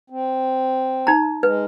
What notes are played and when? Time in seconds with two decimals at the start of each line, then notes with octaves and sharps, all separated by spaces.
0.10 C4
1.07 D#4 A#5
1.43 G#3 B4